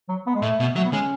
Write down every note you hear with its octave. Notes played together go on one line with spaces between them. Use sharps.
F#3
B3
G#3
A2 A3
B2
F#3 A3
B3
G#3 C#4